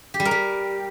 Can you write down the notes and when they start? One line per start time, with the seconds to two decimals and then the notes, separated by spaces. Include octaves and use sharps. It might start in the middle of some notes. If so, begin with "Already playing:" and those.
0.14 G4
0.20 G3
0.25 A#4
0.31 G3